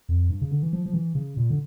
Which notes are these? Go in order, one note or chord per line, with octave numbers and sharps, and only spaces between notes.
F2
G2
C#3
D3
E3
F3
F3
E3
C#3
A#2
D3